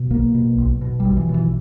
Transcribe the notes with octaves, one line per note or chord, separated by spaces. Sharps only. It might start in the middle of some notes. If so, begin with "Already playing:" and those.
Already playing: B2
B1 A#3
B2
B1
B2
G3
B1
E3
B2
E3